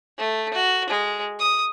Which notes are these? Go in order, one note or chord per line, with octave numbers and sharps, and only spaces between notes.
A3
F#4
G#3
D#6